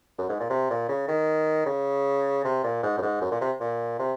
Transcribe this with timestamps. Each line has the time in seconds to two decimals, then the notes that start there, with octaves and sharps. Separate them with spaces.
0.18 F#2
0.29 G#2
0.40 A#2
0.50 C3
0.70 A#2
0.88 C#3
1.08 D#3
1.66 C#3
2.45 C3
2.64 A#2
2.83 G#2
2.98 F#2
3.02 G#2
3.22 F#2
3.31 A#2
3.41 C3
3.60 A#2
3.99 C3